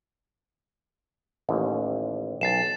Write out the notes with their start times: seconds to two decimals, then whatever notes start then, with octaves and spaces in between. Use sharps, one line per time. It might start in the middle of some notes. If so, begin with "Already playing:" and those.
1.49 A1 D#2
2.41 B1 A6 C7 E7